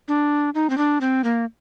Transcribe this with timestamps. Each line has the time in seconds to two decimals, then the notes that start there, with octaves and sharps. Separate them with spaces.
0.08 D4
0.55 D#4
0.70 C4
0.78 D4
1.01 C4
1.24 A#3